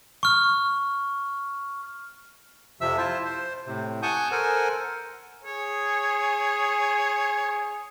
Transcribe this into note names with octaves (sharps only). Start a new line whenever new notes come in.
C#6 F6
F2 C3 F3 E5 E6
E4 F4 C5 A5
C5
A2 C3
F#5 G#5 A5 C#6 D#6 G6
A4 A#4 C5 F#5 G#5
G#4 C#5